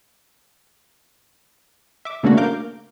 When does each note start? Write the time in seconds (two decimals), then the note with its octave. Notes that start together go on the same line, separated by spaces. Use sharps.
2.05 E5 D6
2.23 C#3 A3 A#3 D4 F#4
2.37 A#4 F5 D6 G6